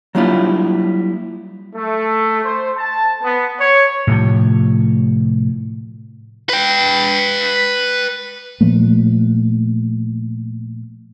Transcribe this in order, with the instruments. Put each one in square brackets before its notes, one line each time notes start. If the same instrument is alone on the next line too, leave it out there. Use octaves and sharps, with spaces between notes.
[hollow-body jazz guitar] F#3 G3 A#3 D4 E4 F4
[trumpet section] A3
C5
A5
B3
C#5
[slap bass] A2 C3 F3
[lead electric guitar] B4 G5
[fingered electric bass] A#2 F3 A3 A#3